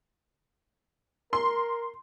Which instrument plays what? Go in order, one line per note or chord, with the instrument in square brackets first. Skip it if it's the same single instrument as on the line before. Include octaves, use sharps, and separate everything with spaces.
[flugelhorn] A#4 [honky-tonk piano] C6